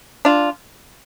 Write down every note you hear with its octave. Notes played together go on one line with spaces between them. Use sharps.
D4 F4